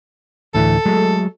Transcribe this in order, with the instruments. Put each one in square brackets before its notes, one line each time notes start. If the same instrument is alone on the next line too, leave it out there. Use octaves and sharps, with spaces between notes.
[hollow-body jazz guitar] D2 A2 E3 [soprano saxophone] A4
[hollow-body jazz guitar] F#3 G#3 A3